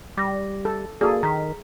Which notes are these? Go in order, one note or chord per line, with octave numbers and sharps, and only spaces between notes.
G3 D6 A#6
A4
A#3 F#4 G#4 A4 D5
D#3 A#5 F6 B6